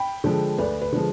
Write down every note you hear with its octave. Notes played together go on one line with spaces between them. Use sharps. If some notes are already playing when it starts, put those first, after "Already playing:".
Already playing: G5 B5
D3 F3 G#3
D2 B4 D5
B4
D3 F3 G#3